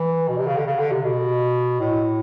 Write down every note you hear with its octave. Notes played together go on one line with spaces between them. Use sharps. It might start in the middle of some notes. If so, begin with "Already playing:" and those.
Already playing: E3
B2
C3
C#3
D3
C#3
D3
C3
B2
A2